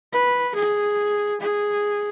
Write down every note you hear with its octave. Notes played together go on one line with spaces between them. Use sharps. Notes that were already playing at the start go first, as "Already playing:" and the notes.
B4
G#4
G#4